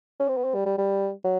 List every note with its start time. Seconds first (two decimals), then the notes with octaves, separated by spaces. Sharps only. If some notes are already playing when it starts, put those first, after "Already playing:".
0.20 C#4
0.28 C4
0.37 B3
0.44 C4
0.55 G3
0.66 G3
0.78 G3
1.24 F#3